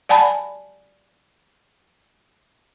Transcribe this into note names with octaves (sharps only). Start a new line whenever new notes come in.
D5 F#5 G#5 A5 B5